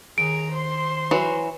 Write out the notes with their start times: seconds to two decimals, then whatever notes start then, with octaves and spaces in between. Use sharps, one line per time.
0.18 D#2 D#3 G#4 A#5 D7
0.52 C5 C6
1.11 E3 F#3 F#4